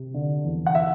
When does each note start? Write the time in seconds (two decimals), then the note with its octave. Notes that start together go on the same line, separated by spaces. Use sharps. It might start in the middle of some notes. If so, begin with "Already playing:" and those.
Already playing: C3
0.14 D3
0.45 E2
0.66 F#5
0.75 E5